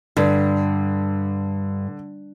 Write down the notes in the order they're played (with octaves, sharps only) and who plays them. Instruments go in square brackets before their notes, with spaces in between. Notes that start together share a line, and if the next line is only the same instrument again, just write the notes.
[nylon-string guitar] G2 [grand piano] D3